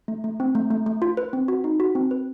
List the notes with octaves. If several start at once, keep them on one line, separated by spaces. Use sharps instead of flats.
A3
A3
C4
A3
A3
A3
F4
B4
C4
F#4
D#4
F#4
C4
B4